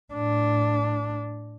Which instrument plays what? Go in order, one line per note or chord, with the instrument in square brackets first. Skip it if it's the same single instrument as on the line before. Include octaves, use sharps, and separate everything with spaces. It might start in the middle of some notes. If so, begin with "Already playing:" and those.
[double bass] A2 D4